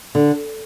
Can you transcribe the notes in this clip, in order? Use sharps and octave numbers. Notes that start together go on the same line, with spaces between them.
D3